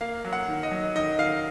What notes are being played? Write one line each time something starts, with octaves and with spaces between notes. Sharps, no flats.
A#3 F5
F#3
F#5
D#3
D#5
F#3
D#3 D#5
D#3 F5